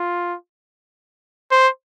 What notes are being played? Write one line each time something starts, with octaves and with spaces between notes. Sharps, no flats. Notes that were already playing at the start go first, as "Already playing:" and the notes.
Already playing: F4
C5